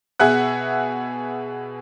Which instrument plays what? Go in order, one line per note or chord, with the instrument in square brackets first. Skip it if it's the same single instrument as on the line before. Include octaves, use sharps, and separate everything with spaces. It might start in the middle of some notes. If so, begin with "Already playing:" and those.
[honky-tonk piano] B2 G#4 E5 F#5 F#6